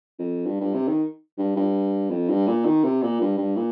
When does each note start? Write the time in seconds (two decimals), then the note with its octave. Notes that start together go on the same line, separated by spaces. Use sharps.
0.19 F2
0.46 G2
0.60 G2
0.74 C3
0.88 D#3
1.38 G2
1.56 G2
2.10 F2
2.30 G2
2.47 A#2
2.65 D#3
2.84 C3
3.02 A#2
3.21 G2
3.38 G2
3.56 A#2